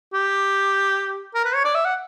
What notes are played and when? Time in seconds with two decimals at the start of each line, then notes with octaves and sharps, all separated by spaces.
0.13 G4
1.34 A#4
1.45 B4
1.55 C#5
1.64 D5
1.74 E5
1.85 F#5